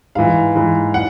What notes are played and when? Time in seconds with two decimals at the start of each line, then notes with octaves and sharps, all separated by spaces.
0.15 G#2 E3 F5
0.55 G#2 E3
0.94 F#5